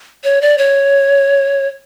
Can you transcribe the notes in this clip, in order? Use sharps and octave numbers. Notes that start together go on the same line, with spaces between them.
C#5
D5
C#5